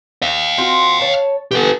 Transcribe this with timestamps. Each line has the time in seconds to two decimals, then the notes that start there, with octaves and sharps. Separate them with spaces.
0.22 D#5 F5
0.58 C4 F4 F#4
1.00 C#5 A5
1.51 E3 F3 B3 G4 A4